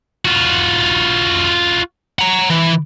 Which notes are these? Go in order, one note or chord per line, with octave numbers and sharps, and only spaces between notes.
F4 F#4
F#5 A#5
E3